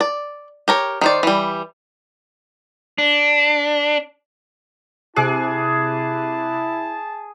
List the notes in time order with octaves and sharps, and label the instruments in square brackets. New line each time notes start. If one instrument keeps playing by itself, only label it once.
[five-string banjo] D5
G4 A#4 C#5
D#3 C5 D5
E3 G3
[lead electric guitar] D4
[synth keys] C3 D6 F#6 [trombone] E4 [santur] G#4 [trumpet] A5